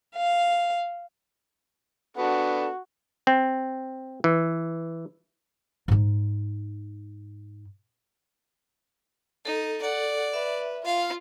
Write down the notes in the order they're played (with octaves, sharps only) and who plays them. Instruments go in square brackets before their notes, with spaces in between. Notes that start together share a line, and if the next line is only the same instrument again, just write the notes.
[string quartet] F5
[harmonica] B3 D4 A4 [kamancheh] F#4
[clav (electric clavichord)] C4
E3
[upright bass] G#2 D#4
[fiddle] D#4 [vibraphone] A4
[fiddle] D5 [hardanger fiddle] F#5
[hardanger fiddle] B4 [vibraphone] E5
[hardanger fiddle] F4 [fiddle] F5